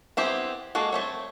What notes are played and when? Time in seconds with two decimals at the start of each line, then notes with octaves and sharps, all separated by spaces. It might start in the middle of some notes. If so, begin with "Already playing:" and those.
0.17 B3 C4 E4 G4
0.75 G#3 A#3 F#4 A4
0.93 A3 C4 C#5